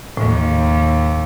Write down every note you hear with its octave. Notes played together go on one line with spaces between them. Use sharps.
D#2 A2